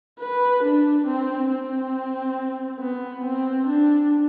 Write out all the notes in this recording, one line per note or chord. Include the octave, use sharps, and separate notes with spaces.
B4
D4
C4
C4
B3
C4
D4